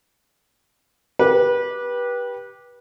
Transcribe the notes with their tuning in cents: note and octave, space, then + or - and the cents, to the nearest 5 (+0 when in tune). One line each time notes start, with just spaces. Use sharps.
G4 +0 B4 -25